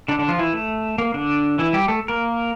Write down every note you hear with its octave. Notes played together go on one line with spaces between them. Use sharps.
D3 D4
D3 D4
F3 F4
E3 E4
A3
A#3
D3 D4
E3 E4
G3 G4
A3 A4
A#3 A#4